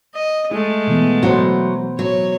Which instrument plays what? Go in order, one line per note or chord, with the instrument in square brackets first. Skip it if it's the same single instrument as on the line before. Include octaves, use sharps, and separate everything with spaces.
[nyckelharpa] D#5
[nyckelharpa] G#3 A3 [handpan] E4
[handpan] B2 E3 B3
[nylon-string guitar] F#3 F#4 [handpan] E4 C5
[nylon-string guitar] F#3 [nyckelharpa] C#5